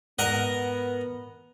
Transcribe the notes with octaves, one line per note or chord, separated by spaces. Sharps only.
G#2 B3 A#4 D#5 F#5